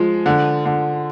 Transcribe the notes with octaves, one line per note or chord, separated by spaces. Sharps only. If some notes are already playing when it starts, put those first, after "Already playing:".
Already playing: F3 G#3
D3
D3